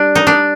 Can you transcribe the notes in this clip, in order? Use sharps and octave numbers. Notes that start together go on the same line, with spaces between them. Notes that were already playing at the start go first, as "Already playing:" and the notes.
Already playing: G3 D4
D#4
D4